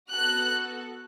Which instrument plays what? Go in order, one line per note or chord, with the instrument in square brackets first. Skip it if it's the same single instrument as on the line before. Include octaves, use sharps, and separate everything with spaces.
[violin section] B3 F#4 A4 F#6